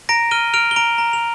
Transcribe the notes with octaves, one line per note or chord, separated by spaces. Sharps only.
A#5 A#6 D7
F6 D#7 G7
F6 D7 F7
G7
A#5 D7 F7
A#5
F7